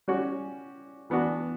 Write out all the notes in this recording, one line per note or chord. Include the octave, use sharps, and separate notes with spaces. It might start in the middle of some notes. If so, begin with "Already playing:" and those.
G3 C#4 F#4
E3 B3 D4 F#4